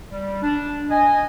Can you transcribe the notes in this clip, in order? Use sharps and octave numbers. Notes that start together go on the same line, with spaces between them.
G3
D4
D#5 G#5